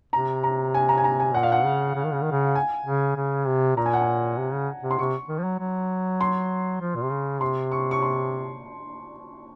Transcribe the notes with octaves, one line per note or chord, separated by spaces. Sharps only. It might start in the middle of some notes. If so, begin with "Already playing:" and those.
C3 A#5
A#5
G#5
A#5
G#5
A#5
G#5
A#2 F#5
F5
F#5
C#3
C#3
D#3
C#3
D#3
C#3
G#5
C#3
C#3
C3
A#2 A#5
G#5
F#5
G#5
C3
C#3
C3
C6
C3 C#6
D#3
F3
F#3
F#3
C6
F3
A#2
C3
C#3
C3 C6
C#6
C#6
C6